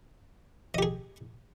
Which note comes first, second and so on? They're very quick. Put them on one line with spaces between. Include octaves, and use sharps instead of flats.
D#5 G4 G#4